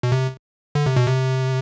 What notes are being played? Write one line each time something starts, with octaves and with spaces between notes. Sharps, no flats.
B2
C3
D3
C3
B2
C3